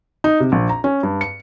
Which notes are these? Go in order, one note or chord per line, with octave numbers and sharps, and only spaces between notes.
D#4
C3
A#1
A#5
C#4
G2
C#7